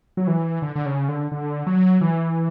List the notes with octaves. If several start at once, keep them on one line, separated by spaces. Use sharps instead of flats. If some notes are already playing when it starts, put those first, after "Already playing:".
F#3
E3
D3
D3
C#3
D3
D3
F#3
E3